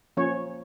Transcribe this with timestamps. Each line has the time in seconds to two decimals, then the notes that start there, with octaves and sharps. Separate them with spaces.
0.17 F3 A#3 C#4 C#5